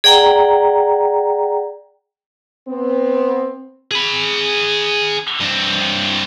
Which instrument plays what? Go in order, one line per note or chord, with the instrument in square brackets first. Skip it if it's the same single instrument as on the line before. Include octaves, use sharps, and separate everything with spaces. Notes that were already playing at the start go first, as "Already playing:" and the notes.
[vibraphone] G#4 D5 F#5 G5 A#5
[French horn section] B3 C4
[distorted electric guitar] G#4 B5
G2 C4